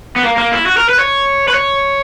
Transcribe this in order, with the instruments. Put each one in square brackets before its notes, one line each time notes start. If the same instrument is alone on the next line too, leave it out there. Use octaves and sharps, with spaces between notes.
[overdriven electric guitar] B3
A#3
A#3
E4
F#4
A#4
B4
C#5
B4
C#5